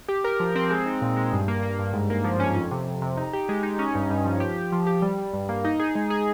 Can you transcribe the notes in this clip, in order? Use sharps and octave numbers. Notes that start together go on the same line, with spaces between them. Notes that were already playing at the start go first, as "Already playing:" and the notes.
G4
A#4
F3
C4
G#3
D#4
A#2
G#3
G2
A#3
A#3
G2
G#2
A#3
F3
C#4
F2
C3
F2
C3
D#4
G4
G#3
D#4
C#4
G2
G2
F3
G4
G4
F3
G4
G3
G3
G2
A#3
D#4
G#4
G#3
G#4